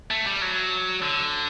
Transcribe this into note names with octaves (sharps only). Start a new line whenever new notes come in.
A3
G3
F#3
D3